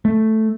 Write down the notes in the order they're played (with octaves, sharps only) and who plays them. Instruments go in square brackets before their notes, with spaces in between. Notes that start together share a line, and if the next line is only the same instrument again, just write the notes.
[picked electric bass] A3